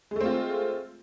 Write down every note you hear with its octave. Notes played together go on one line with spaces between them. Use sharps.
G#3 A3 C4 F4